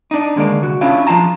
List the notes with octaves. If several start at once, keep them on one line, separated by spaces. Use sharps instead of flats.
D4 D#4
D#2 D3 G#3 A#3 D5
C2 F#4
C#4 D4 E4 F4 F5
F3 F4 F5 A5 A#5